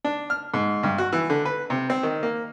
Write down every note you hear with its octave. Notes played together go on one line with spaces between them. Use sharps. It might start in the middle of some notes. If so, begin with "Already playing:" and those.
D4
F6
G#2
G2
F#4
E3
D3
B4
C3
C4
D#3
A#3